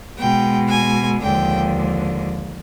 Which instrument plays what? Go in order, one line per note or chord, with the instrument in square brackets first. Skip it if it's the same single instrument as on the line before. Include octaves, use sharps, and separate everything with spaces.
[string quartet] B2 G#3 G5
G#5
D#2 D3 F3 G#3 G5